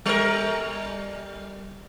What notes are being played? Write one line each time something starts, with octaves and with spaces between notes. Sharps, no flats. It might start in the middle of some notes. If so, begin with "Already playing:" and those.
G3 A#4